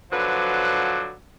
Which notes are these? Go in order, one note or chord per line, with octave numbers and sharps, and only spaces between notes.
D3 F3 F#3 B4 C5 D5